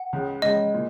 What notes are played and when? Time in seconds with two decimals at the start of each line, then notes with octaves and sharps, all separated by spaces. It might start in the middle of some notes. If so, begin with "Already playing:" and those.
Already playing: F#5
0.13 C#2 C#3 G#3
0.42 C#2 C#3 G#3 D#5
0.74 A#2